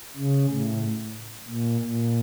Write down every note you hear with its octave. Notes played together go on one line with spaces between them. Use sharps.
C#3
A2
A#2
A#2